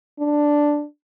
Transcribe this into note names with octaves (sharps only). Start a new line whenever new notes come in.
D4